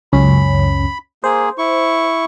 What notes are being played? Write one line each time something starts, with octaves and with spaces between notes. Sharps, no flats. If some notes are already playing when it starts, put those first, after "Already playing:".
C#2 F#2 C#4 B5
A#3 G#4 C5
E4 C#6